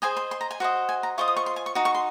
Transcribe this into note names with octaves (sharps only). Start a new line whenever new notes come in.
G#4 C5 D#5 G#5
C6
C6
A#5
G#5
F#4 C5 D#5
G#5
A#5
F4 C5 D#5 C#6
D#6
C#6
C6
G#5
C#6
D#4 F#4
C#6
C6